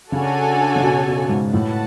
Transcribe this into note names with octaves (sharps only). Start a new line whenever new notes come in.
C#3 D4 F#4 A4 C#5 G#5
C#3
B2
B2
G#2
A2 F#4 B4 F#5 A5